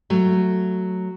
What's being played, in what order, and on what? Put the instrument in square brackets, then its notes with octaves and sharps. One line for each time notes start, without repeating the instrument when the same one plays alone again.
[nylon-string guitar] F#3 A3